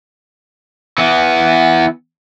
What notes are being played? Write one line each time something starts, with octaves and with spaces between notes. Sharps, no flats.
E3 B3